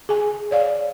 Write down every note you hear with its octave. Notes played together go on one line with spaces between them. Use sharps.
G#4 G#5
C#5 D5 F5